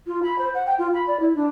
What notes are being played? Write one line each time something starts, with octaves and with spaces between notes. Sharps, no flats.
F4
B5
C5
F#5
G5
F4
B5
D5
E4
D4